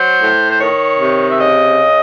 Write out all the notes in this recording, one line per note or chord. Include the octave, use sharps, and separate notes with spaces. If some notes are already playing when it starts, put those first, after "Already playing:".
Already playing: F#3 C5
A2
C5
D#3 C#5
C3
E5
C#3 D#5